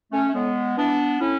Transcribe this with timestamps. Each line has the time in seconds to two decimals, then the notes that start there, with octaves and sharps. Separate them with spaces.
0.11 A3 C#4
0.28 A3
0.33 A2 G#3 B3
0.76 E3 B3 D4
1.20 A2 C#4 E4